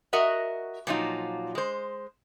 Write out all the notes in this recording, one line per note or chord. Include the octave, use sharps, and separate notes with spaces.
F#4 A#4 D#5 E5 F#5
A#2 F3 F#3 D#4 F4
G#3 C5